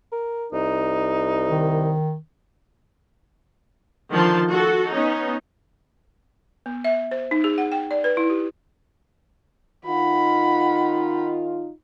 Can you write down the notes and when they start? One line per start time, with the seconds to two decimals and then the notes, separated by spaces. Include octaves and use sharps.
0.12 A#4
0.52 C2 D#4
1.50 D#3
4.11 D3 D#3 F3 A5 C6
4.51 F#4 A4
4.92 B3 C#4 D#4
6.66 B3
6.85 E5
7.11 C5
7.31 D#4
7.44 G#4
7.58 F#5
7.72 G5
7.91 D5
8.04 B4
8.17 E4
8.30 G4
9.86 D#3 D#4 F4 F#5 B5